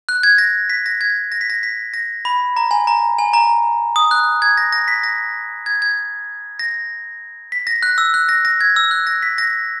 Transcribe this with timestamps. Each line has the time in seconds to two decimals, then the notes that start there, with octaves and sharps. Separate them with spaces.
0.09 F#6
0.23 G#6
0.38 A#6
0.70 B6
0.86 A#6
1.01 G#6
1.32 A#6
1.41 B6
1.50 A#6
1.63 B6
1.94 A#6
2.25 B5
2.57 A#5
2.71 G#5
2.87 A#5
3.19 G#5
3.34 A#5
3.96 D#6
4.11 F#6
4.42 G#6
4.57 A#6
4.72 A#6
4.88 B6
5.03 A#6
5.66 G#6
5.82 G#6
6.59 A#6
7.52 B6
7.67 A#6
7.83 F#6
7.98 E6
8.14 F#6
8.29 A#6
8.45 A#6
8.61 G#6
8.76 E6
8.91 F#6
9.07 A#6
9.22 B6
9.38 A#6